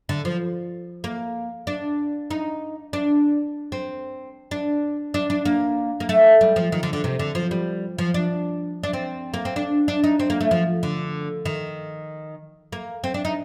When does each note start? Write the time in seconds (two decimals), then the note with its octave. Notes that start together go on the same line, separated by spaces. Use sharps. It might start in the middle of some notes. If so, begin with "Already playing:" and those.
0.09 D3
0.25 F3
1.04 A#3
1.67 D4
2.30 D#4
2.93 D4
3.72 C4
4.51 D4
5.14 D4
5.30 D4
5.45 A#3
6.00 A#3
6.09 A3
6.41 G3
6.56 F3
6.72 D#3
6.83 D3
6.93 D3
7.04 C3
7.19 D3
7.35 F3
7.51 G3
7.98 F3
8.14 D4
8.83 D4
8.93 C4
9.34 A#3
9.45 C4
9.56 D4
9.88 D4
10.04 D#4
10.20 C4
10.30 A#3
10.41 A3
10.51 F3
10.83 D3
11.45 D#3
12.72 A#3
13.04 C4
13.14 D4
13.25 D#4